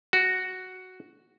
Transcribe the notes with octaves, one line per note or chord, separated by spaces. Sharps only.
F#4